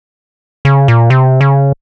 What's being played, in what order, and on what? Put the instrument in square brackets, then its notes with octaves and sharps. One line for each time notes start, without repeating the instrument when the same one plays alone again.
[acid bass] C#3
A#2
C3
C#3